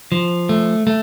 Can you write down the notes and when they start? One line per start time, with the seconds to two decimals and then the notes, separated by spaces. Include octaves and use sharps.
0.12 F3
0.49 A3
0.87 A3